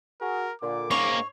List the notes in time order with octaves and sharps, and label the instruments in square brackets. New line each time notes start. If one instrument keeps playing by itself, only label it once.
[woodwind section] F#4 G#4 [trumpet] A#4
[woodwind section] A#2 D3 [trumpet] D6
[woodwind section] G#2 [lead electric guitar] A#3 C#4 [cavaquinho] C#5